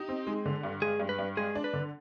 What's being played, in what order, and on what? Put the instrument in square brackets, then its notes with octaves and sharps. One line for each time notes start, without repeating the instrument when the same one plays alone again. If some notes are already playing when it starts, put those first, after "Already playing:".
Already playing: [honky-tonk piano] D#4 [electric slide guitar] G4
[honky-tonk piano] C4
G#3
D3
G2
[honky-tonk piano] G#3 [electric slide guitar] G#4
[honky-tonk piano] G2
[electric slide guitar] B4
[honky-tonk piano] G2
[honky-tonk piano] G#3 [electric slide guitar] G#4
[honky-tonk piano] D4
[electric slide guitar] B4
[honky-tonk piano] D3